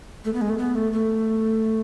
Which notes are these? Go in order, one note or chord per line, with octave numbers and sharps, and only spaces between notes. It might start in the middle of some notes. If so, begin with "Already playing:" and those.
A3
B3
G#3
A3
B3
A3
A3